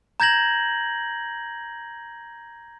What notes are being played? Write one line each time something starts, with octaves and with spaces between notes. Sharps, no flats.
A#5 G6 G#6 A#6 F#7